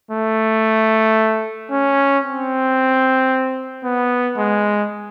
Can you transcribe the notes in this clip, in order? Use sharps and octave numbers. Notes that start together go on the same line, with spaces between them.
A3
C#4
C4
B3
G#3